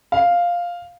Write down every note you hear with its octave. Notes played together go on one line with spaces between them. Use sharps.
F5